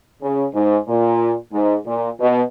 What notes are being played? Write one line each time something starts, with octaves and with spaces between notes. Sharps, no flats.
C#3
G#2
A#2
G#2
A#2
B2